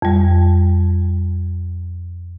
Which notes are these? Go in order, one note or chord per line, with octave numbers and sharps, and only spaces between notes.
F2 G3